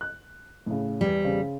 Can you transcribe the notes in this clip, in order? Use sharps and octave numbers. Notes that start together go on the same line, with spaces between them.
F#6
A2 C#3
E2 G3
C#3 C5